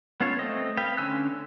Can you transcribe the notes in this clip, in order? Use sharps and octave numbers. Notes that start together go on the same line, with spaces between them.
B3 C#4 F4 A4 C#5
A3 C4 D#5
B4 F5 G5
D3 C#4 G#5 E6 F#6